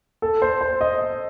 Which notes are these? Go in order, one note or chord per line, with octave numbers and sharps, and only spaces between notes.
A4
C5
C5
D#5